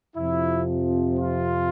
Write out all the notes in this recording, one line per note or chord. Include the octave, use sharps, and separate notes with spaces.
F2 C3 F3 E4
F4